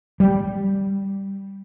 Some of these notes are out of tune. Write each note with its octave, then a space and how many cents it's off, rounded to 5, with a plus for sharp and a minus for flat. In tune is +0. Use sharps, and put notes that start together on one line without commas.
G3 +0